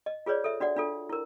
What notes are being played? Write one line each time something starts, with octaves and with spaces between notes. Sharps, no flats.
D#5
F4 G#4 B4 C#5 D5
A4 E5
D4 F#4 D5 F#5
D4 F4 A4
E4 A#4